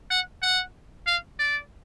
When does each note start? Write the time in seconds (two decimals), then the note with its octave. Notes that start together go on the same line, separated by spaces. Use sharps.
0.10 F#5
0.42 F#5
1.07 F5
1.39 D5